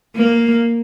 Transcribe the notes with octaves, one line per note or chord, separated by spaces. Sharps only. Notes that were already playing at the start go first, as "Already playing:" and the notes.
A#3